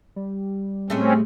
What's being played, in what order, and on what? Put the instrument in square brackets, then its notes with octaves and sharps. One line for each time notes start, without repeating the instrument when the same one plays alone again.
[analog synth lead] G3
[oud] A2 G#3 A3 [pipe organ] C4 C#4